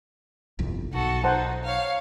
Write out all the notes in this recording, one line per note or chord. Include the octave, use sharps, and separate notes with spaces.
G1 C2 F2
B1 F#4 A4
D#4 C5 F#5 A5
C#5 F5